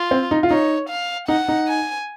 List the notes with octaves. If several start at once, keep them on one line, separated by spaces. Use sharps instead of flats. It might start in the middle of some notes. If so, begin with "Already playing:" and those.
Already playing: F4
C4
D#4
F4
D#4 C#5
F5
D#4 F#5
D#4
G#5